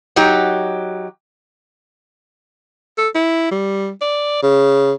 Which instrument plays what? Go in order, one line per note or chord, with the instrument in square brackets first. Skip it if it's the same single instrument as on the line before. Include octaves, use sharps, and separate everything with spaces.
[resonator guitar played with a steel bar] F#3 D#4 G4
[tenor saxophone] A4
E4
G3
D5
C#3